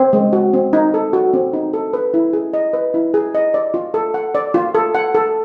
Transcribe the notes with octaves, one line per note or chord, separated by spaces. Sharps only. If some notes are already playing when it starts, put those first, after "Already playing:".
Already playing: C4
G#3
F#4
C4
D#4
A4
F#4
C4
D#4
A4
B4
E4
G#4
D#5
B4
E4
G#4
D#5
D5
F4
A4
F#5
D5
F4
A4
F#5
A4